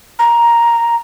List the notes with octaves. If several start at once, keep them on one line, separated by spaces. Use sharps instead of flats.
A#5